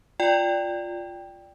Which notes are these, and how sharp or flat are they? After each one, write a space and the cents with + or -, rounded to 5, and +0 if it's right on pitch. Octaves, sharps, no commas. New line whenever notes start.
F4 +0 D5 +0 G5 +5